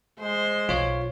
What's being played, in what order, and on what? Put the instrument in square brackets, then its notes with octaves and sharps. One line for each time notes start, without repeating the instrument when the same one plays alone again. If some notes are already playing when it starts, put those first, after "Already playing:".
[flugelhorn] G#3 [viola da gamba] C5
[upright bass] B1 [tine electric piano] F4 C#5